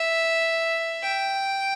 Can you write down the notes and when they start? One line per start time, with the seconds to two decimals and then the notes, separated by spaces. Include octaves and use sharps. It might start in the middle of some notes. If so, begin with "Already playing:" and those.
Already playing: E5
1.04 G5